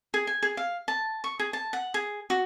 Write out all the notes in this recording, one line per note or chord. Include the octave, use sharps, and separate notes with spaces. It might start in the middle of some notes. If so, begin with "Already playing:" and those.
G#4
G#5
G#4
F5
A5
C#6
G#4
A5
F#5
G#4
F#4